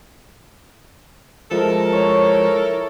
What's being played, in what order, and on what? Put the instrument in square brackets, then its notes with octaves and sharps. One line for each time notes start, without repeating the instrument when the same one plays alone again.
[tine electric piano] F3 G#3 [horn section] E4 A4 A#4
[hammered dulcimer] C#5